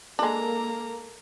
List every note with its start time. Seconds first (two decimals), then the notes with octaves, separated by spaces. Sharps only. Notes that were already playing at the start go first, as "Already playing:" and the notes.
0.19 G#3 A#3 D4 A4 A#5